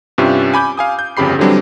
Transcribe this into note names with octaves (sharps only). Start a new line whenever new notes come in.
G2 C3 C#4 F4 G4 E5
G#5 B5 D6 G6
F5 G#5 D#6
G6
G1 F2 C#3 G4 B5 C7
D3 E3 F#3 G3 C4 D4